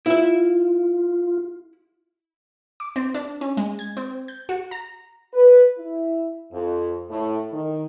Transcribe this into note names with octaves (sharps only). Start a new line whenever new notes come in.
E4 F4 E5
D6
C4
D4
C#4
G#3
G#6
C4
G6
F#4
A#5
B4
E4
F2
A2
D#3